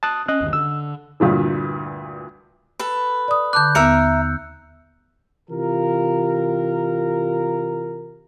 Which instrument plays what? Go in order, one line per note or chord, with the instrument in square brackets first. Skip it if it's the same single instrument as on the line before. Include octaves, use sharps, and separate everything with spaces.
[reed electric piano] A5 D#6 F#6
[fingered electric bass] C#4 [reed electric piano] D#5 F#6
[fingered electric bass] G1 D#2
[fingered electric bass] D3 [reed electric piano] E6
[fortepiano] D2 G2 A#2 E3
[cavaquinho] A4 B4
[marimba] D5 D#6
[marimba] D3 A5 D6 [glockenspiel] F#6 G6
[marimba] D#2 B3 [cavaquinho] A#4 E5 [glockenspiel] E6 C#7
[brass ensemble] C3 E3 F4 G4 A#4